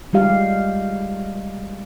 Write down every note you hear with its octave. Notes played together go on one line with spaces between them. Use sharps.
G3 G#3 G4 F5